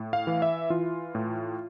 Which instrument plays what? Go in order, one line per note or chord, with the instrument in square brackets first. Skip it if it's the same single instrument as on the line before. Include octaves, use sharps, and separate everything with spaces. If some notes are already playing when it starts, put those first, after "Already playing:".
Already playing: [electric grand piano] A2
F5
E3
E5
E3 F4
A2